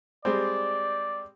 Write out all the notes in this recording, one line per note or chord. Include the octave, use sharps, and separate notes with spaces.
G3 G#3 C4 D5